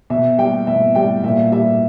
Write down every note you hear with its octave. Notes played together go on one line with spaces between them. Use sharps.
B2 E5
G3 G5
B2 E5
G3 G5
A#2 E5
G3 E5